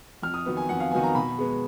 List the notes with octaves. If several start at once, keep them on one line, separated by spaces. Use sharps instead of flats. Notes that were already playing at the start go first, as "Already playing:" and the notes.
F2 F6
D#6
D#3 F#3 B3
G#5
F2 F#5
F5
D#3 F#3 B3 G#5
A#5
B2 B5
G#3 B3